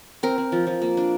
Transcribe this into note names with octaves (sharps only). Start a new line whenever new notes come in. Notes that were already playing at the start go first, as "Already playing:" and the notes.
C4 A#4
C4
F3
F3
A#3
D4